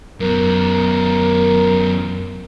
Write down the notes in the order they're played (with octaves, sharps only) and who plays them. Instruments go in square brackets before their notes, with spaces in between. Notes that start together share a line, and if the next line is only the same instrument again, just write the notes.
[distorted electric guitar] F#2 B3 [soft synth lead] A#4